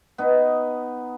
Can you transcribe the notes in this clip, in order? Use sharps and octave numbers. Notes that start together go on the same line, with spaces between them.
B3 D#4